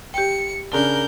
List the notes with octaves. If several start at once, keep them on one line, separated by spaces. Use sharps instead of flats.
G4 G5 C#7
C#3 D4 A#4 G6 G7